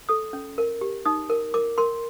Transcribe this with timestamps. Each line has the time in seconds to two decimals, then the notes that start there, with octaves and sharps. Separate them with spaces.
0.09 A4 D#6
0.33 C#4
0.58 A#4
0.81 G4
1.05 D#4 D#6
1.30 A#4
1.54 A#4 D6
1.78 A#4 C6